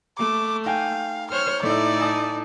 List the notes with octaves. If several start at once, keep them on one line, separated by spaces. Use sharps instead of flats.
A3 D6
D#4 F5 G5 G#5
C5 C#5 F6
A2 A3 D#4 E4 D5
G#5 A5 D#6